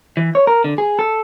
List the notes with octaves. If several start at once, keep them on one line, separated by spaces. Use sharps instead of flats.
E3
C#5
A#4
D3
G#4
A4